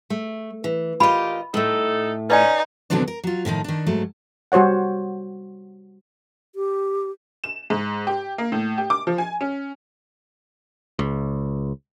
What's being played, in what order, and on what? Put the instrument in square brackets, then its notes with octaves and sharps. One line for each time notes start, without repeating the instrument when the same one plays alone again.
[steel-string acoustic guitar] A3
E3
[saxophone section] A#2 G4 [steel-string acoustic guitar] F4 D#5 [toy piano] B5
[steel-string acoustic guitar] A2 A3 [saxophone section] D#4 A4
[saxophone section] C#4 [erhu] D#4 [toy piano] B4 D5 G#5
[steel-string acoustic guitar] B2 D3 D#3 F#3 C4 D4
A#4
F#3 F4
A2 D#3 F3 D#4
D#3 D4
G#2 F#3 A3
[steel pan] G3 F#4 C5 C#5 F#5
[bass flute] G4
[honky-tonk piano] E7
G#2
G4
A#3
A2
G4
D6
F3
G#5
C#4
[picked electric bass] C#2